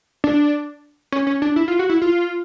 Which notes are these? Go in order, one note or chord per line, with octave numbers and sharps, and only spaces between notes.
D4
C#4
C#4
D4
E4
F4
F#4
E4
F4